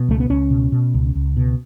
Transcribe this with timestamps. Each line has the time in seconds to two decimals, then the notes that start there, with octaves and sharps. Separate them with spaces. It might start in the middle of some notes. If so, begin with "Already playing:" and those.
Already playing: B2
0.09 C#2 A3
0.20 B3
0.30 C#2 C#4
0.51 B2
0.72 B2
0.94 C#2
1.15 C#2
1.37 B2